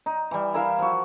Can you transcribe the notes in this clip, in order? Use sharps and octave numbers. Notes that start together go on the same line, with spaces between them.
D#4
E3 G3
E4 A#4 E5 F5
F3 F#4